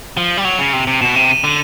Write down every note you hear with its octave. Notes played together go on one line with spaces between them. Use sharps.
F3 G7
F#7
G3
F#3 F7
C#3
C3
C3
B2 E7
C3
D#7
D3